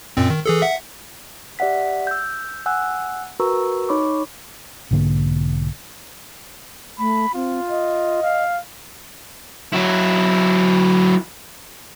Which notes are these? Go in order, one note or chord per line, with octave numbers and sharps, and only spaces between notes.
F#2 A#2 C4
D#3
E3 G#4 A4
E5 F#5
G4 D5 E5 F#5 B6
E6 G6
F#5 G#5 E6 F#6
F#4 A#4 B4 A#5 C#6 E6
D#4 C#5 B5 C#6 D6
B1 G#2 D3 A#3
A3 B5
C4 F4
D#5
F5
F#3 E4